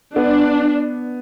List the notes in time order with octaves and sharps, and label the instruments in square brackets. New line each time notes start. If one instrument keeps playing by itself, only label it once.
[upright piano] B3 [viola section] D4